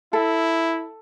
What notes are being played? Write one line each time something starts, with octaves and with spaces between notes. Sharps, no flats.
E4 A4